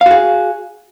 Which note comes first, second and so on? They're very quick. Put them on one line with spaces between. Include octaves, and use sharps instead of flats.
F5 F#4 G#4